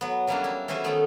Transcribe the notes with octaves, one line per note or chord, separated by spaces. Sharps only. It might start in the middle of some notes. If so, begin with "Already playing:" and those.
F#3 B3
E3 F#3 G3 A#3 C#4 D4
D4 E4
E3 C#4 F#4 B4 C5 E5
D#3 A3 B3 D#4 G5 A5